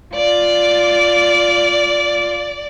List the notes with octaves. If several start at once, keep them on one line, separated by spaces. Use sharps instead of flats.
F4 D5